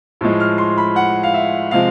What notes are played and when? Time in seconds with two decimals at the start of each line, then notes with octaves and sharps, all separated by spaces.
0.21 A2 F3 G#3
0.40 F6
0.58 C6
0.78 B5
0.96 F#5
1.23 F5
1.34 E5
1.71 C3 F3 G#3 F5